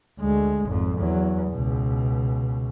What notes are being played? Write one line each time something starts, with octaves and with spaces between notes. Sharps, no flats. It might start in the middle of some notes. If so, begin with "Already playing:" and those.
D2 G#3
G#1 F2
E2 F#3
C#2 B2